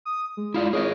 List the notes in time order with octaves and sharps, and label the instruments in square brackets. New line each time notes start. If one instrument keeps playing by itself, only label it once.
[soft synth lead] D#6
G#3
[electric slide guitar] E4 F4 D5
[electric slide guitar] G#4 A#4 D#5 [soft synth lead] C#5